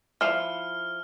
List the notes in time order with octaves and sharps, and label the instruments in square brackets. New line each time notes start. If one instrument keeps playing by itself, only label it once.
[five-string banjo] F3 E4 F5 [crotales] F6